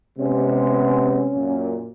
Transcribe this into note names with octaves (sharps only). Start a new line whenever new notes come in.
C3 G#3 B3 C#4
F#2 A#2